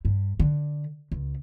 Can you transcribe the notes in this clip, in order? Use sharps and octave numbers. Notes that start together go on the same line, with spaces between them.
G2
D3
C#2